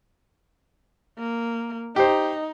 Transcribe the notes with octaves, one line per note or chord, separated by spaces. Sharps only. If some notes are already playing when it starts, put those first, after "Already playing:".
A#3
D#4 G4 C5